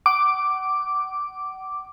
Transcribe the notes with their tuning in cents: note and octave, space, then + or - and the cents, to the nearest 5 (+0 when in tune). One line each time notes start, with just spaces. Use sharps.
F#5 +35 D6 +0